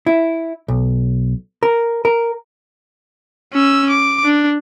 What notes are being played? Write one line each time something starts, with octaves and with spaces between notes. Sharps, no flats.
E4
B1
A#4
A#4
C#4 E6
D6
D4